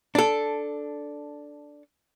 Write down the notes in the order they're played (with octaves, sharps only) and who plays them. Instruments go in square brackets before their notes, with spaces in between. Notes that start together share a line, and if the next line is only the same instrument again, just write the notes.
[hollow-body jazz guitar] D4 A4